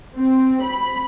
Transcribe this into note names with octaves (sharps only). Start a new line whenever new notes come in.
C4
B5